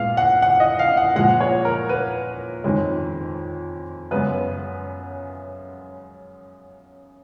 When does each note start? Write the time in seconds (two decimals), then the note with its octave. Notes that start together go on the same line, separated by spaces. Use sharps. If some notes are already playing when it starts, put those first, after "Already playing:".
Already playing: A#2 G#3 B3 F5
0.17 F#5
0.42 F#5
0.60 D#5
0.79 F5
0.97 F#5
1.16 A#2 F3 G#3 F#5
1.40 C#5
1.65 A#4
1.89 B4
2.64 F2 D#3 G#3 C#4
4.11 F#2 C#3 G#3 B3 B4